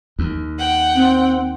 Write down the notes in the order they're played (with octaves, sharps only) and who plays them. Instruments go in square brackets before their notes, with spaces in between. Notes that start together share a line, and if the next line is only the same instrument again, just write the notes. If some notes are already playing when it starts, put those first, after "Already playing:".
[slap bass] D#2
[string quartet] F#5 G5
[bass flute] C4